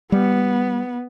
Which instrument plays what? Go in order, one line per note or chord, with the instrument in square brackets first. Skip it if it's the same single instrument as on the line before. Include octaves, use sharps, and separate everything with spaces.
[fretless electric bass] G3 [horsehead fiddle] B3